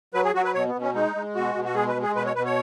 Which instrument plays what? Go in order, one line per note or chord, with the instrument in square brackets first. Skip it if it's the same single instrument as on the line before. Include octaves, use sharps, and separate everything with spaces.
[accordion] F#3 B4
G#4
F#3 F#4
B4
B2 C#5
B3
B2
C#4
G#3 D#4
G#3
B2 F#4
B2
F#4
G#3 G#4
B4
G#3
G#4
B2 B4
C#5
B2 B4
C#5